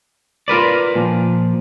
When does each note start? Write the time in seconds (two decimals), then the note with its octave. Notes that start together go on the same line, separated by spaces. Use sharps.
0.48 F4 A#4 B4 D5
0.95 A#2 F3